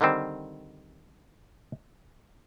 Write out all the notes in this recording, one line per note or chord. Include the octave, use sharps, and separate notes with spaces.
D3 D#3 G3 C4